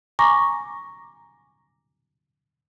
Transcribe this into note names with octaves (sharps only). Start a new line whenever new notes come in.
G#5 A#5 C#6 D6 A#6